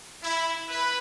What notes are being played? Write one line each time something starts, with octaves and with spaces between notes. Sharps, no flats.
E4
B4